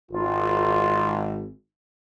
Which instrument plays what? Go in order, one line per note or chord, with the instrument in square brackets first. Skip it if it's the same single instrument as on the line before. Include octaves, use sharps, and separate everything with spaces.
[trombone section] G#1 [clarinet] F4